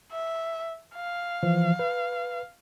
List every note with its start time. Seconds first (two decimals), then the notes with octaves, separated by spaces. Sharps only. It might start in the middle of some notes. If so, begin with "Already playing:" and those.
0.12 E5
0.95 F5
1.43 E3 F3
1.79 B4